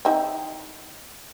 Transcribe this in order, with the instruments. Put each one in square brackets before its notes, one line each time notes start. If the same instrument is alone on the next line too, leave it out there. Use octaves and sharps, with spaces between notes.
[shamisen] C4 D#4 E4